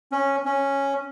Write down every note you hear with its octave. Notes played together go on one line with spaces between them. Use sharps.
C#4
C#4